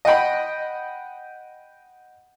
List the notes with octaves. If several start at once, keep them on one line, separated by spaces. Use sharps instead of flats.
D#5 F#5 G5 B5